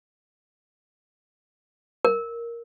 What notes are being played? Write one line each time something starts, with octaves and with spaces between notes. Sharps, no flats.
A#4